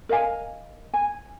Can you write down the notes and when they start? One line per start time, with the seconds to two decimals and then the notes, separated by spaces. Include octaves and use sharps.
0.09 A#4 D#5 F5 G#5
0.94 G#5